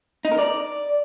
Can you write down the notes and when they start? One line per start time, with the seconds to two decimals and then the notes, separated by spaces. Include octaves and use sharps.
0.25 D#4
0.32 A#4
0.38 D5